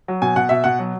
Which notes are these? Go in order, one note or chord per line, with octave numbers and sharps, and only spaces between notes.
F#3
B2 G#5
B2 F#5
B2 E5
B2 F#5
F#3